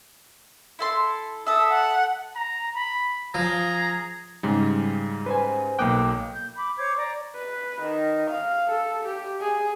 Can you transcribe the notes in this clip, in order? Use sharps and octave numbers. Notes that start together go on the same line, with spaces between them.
E4 A4 C6
A4 E5 D#6
F#5
A#5
B5
F3 G#4 A#5
G#2 C#3 G3
B4 C5 G#5
B1 A#3 G5 D6 D#6 F#6
G6
B5 D6
C5 C#5 D6 G#6
D5 A#5
B4
D#3
F5
A4
G4
G#4